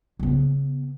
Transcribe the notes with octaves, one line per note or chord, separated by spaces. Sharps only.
C#3 B3